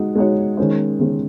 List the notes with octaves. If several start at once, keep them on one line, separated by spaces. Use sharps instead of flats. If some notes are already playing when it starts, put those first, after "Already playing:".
Already playing: G#3 D#4 F#4
G#3 D#4 F#4 C#5
D#3 G#3 C#4 G#4 C5
D#3 G#3 C#4 G#4 C5